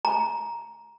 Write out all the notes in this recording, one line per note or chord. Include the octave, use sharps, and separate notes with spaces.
A#5